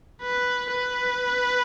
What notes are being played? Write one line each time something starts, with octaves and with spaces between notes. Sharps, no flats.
B4
B4